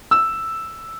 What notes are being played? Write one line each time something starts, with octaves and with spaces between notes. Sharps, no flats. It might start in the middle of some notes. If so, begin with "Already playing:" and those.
E6